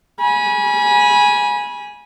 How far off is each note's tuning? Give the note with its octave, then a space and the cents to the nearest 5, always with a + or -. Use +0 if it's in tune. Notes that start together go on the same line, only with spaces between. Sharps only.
G#5 +0 B5 -30